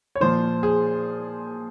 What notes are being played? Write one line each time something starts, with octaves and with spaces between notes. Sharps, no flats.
C#5
A#2 F3 C5
G#4